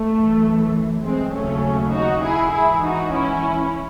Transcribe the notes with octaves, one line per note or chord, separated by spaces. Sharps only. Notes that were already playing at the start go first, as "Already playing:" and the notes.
Already playing: A3
F#2 E3
G#3 C4
D#2 C#3 F#3 A3 C#4
D#4 F#4
E4 G#4
G#2 E3 E4 G#4
D#4 F#4
C#4 E4